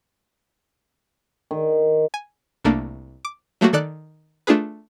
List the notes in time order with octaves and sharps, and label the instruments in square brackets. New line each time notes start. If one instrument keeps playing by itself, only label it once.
[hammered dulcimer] D#3
[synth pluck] G#5
C2 A3 A#3 D4
D6
F#3 A3 A#3 F#4
D#3 A4 D5 F#6
A3 D4 F4 G#4 B4